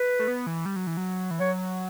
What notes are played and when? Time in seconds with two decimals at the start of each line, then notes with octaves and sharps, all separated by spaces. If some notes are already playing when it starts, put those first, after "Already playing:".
Already playing: B4
0.19 A3
0.28 B3
0.47 E3
0.66 G3
0.76 F#3
0.87 E3
0.97 F#3
1.31 E3
1.40 F#3 C#5